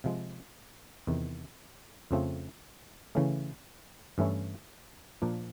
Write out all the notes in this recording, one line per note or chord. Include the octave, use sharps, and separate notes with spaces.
C3 F3 G#3
E2 C3 D#3
F2 C#3 F3 A3 C4
C#3 E3 A3 C#4
G2 E3 A3 C#4 E4
A#2 F3 A#3 D4